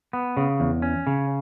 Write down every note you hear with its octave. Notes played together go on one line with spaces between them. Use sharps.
B3
C#3
E2
C#4
C#3